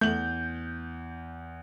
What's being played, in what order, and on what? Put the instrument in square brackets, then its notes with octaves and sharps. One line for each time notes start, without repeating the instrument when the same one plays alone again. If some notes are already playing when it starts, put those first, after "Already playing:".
[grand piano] E2 F#7 [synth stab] A3 [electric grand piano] G6